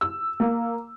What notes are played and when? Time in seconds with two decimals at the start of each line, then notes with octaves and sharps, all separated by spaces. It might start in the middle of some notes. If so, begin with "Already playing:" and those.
0.01 E6
0.40 A#3